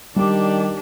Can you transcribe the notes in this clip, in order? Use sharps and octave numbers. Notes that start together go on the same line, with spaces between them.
D#3 G3 D4 G4 D6